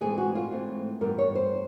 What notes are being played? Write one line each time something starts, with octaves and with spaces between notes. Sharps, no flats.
G#2 E3 A3 C4 G#4
F#4
F4
G#2 E3 A3 C4
G2 E3 G3 B3 A#4
C#5
C5